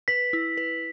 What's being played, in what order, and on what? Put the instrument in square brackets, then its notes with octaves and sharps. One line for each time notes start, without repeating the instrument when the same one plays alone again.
[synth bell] B4 [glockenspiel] B6
[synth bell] E4
B4